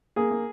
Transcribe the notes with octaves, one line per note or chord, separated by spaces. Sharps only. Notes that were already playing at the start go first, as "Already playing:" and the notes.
A#3 G#4
A#3